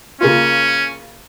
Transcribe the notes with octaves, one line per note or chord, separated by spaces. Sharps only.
C#3 A#3 C#4 F4